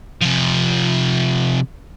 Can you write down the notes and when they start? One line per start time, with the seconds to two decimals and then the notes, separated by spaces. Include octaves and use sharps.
0.21 C3 F3